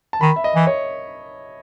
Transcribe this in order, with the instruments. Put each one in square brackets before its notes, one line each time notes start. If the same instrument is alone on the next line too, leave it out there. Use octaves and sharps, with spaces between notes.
[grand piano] A5
[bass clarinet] D#3 [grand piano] B5
[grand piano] E5
D#5
[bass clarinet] E3
[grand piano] C#5